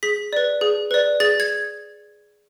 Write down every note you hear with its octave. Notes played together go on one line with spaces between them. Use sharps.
G#4 B6
B4 D5
G#4
B4 D5
G#4 A6
G#6